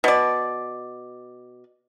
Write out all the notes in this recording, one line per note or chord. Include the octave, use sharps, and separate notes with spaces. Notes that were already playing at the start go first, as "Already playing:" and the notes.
B2 D5